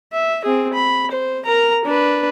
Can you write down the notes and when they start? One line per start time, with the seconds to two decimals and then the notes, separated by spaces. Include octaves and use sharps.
0.12 E5
0.44 C4 G#4
0.73 B5
1.11 C5
1.45 A#4 A#5
1.85 D4 B4